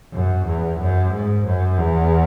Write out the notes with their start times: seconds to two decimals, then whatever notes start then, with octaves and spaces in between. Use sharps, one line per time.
0.13 F#2
0.47 E2
0.80 F#2
1.12 G#2
1.45 F#2
1.78 E2